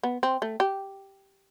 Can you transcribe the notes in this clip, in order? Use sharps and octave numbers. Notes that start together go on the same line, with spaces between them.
B3
C4
A3
G4